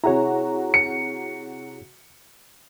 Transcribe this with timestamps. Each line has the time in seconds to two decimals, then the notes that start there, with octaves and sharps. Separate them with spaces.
0.04 C3 E4 F#4 G#4 C#5 A#5
0.74 C#7